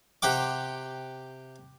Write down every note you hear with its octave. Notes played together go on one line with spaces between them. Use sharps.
C3 G4 F#5 G5 D6